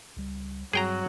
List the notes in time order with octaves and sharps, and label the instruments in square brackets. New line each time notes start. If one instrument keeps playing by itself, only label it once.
[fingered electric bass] C#2 G3
[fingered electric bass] G2 G3 C4 [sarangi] F#3 [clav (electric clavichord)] G#4 G5 A#5